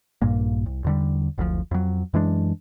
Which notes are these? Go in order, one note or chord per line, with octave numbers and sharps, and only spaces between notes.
A#1 G2 A#2 A#3
C2
E2 D3 G3
F#1 D2 C3 F3
F2 F#3
F#2 E3 G#3 D4